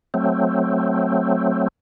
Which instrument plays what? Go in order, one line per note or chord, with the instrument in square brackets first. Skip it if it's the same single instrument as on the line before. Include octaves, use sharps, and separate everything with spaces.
[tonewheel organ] F#3 A3 C4